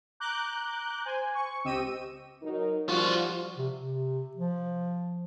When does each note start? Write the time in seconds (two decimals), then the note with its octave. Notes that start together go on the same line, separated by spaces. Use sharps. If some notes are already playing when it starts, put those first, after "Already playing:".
0.20 A#5 D6 F#6 G6
1.05 C5 G#5
1.34 C#6
1.64 C#2 C4 G4 D#5 E6 D#7
2.43 F#3 D#4 A#4
2.89 F3 G3 F4 F#4
3.58 C3
3.76 C3
4.37 F3